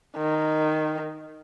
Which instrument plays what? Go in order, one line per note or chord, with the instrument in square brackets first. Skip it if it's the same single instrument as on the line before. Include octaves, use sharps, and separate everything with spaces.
[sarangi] D#3